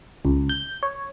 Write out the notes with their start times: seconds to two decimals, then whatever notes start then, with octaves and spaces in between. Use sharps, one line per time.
0.25 C#2
0.49 G6
0.83 C#5